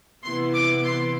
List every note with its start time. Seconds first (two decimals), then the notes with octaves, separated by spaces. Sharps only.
0.23 C3 E3 B3 E4 C6
0.54 D6
0.84 C6